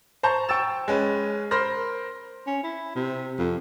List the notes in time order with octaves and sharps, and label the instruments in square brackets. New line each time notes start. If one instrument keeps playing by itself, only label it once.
[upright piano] C5 A5 A#5 C#6 G6
G5 C#6 E6 A6 E7
G#3 C#4 B4
A#4 C5 B5 C6 F6 A#6
[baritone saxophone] C#4
E4
C3
F2